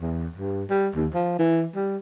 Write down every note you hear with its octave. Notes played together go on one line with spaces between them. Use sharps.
E2
G2
G3
D#2
F3
E3
G3